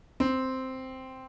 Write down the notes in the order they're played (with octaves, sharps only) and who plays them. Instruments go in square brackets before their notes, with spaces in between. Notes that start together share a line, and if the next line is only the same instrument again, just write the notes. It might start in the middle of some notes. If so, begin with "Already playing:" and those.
[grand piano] C4